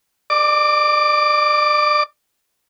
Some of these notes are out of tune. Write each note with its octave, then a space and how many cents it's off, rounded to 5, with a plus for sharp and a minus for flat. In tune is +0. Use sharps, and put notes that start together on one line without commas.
D5 +35 D6 +0